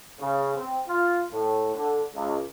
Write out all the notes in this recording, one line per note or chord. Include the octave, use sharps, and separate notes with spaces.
C#3
C4
F4
A2
D3
C#2